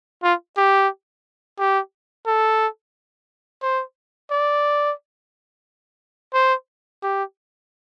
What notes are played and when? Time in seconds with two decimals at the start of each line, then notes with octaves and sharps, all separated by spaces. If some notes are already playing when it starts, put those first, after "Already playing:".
0.23 F4
0.57 G4
1.59 G4
2.26 A4
3.62 C5
4.31 D5
6.34 C5
7.03 G4